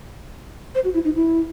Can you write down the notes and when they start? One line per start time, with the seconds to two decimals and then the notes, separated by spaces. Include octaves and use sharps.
0.75 C5
0.84 F#4
0.94 E4
1.05 D#4
1.15 E4